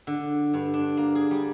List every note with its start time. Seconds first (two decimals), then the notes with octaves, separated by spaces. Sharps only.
0.07 D3
0.54 G2
0.74 D4
0.97 A#3
1.15 G#4
1.31 G3